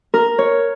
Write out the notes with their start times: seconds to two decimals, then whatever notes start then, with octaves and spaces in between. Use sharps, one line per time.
0.14 A#4
0.38 C#5